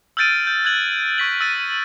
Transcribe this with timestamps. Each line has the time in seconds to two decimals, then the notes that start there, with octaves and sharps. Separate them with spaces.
0.17 E6 F6 G6 A6 D7 D#7
0.47 G6
0.65 F#6 G#6 F#7
1.18 C#6 B6 F#7
1.40 E6 A6 D#7